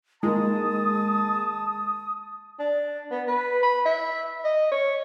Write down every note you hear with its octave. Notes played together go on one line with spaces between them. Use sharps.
D#3 G#3 A#3 A5 D#6
D4
B3
B4
B5
E5
D#5
C#5